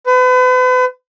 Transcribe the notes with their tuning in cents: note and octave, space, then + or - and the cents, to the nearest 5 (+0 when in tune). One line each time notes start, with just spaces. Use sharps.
B4 +40